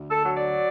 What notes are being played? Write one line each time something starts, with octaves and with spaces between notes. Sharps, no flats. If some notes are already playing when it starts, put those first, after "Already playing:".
Already playing: D2
A4
F#3
D5